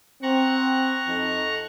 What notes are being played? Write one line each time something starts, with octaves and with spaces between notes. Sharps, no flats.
C4 F#5 A#5 C#6
F2 D#4 A4